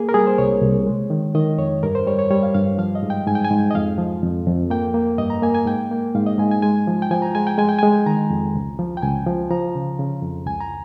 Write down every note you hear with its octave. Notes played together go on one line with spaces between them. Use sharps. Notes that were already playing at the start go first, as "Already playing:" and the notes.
Already playing: A#3 G#4
A#4
G3 G#4
C5
C2 C#5
C2
G#3
D#3
D#3 D#5
F2 C#5
G2 A#4
C5
G3 C#5
C#5
G3 C#5
F5
G2 F5
F3 F5
D#5
G#2
G5
G#2 G#5
G5
G#5
G#2
D#5
F2 F5
F3
F2
F2
A#3 G5
A#3
G2 D#5
A#5
A#3 G#5
G#5
G#2 G5
A#3
G#2 F5
D#5
G#2 G#5
G#5
G#3 G#5
F3
G5
F3 G#5
A#5
G#3 G#5
G5
G#3 G#5
G5
G#3 G#5
D#3 A#5
F2
C#2
F3
G5
C#2 G#5
F3
F3 A#5
C#3
C#3
F2
C#2 G#5
A#5